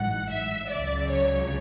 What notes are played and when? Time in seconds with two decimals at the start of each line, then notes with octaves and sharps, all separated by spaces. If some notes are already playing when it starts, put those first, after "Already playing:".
Already playing: A1 G#2 F#3 F#5
0.31 E5
0.70 C#2 C#3 F#3 D5
1.10 C#5